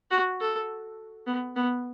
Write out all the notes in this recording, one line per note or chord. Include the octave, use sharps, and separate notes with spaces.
F#4
A4
B3
B3